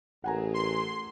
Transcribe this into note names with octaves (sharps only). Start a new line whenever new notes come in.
A1 A3 G#4 A#4 F#5 G#5 A#5
C6